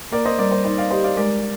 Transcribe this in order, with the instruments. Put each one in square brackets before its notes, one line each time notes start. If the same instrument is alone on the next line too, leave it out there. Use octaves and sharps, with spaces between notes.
[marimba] A#3 [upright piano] A#4 D5
[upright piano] C5 D#5
[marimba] G3 [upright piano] A#4 D5
[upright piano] C5
[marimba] D#4 [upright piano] C5
[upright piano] D5 F5
[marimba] G4 [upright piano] C5 D#5
[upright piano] D5 F5
[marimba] G#3 [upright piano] A#4 D5